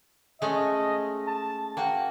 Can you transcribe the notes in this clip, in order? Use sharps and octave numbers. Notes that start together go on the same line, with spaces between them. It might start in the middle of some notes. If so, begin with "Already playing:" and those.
G#3 A3 C#4 D#5
A5
A#3 F#4 F#5 G5